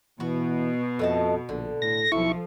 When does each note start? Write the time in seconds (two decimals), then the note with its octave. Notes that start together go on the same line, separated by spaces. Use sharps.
0.20 B2 E3 B3 F#4
0.99 F2 A3 D#5 A5
1.49 A#1 D3
1.82 A2 A#6
2.12 B1 F3 A3 E4 C#6